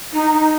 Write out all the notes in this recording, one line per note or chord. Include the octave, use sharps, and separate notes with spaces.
D#4
D#4